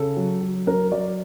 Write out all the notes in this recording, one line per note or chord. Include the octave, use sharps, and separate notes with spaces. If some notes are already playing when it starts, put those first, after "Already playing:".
Already playing: C#3 A4
F#3
F#3
F#3 A#4
F#3 D5